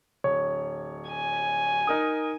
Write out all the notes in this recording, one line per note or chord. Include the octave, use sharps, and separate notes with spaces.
D1 C#5
G#5
D#4 A#4 D#6